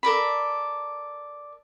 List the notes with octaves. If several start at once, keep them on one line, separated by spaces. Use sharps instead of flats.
A4 A#4 D5 B5